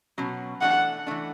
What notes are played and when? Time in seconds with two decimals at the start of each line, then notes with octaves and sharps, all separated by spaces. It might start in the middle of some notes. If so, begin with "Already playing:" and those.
0.18 B2 F#3 C#4
0.61 E3 A3 D4 F#5
1.07 E3 A3 D4